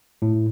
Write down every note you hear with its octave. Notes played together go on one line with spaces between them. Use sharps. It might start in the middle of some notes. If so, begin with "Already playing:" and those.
A2